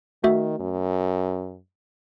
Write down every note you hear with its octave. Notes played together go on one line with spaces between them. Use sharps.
D#3 A3 F#4 E5
F#2